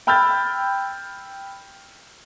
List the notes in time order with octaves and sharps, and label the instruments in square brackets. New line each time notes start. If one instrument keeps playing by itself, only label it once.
[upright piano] G5 B5 E6 F6 G6 A6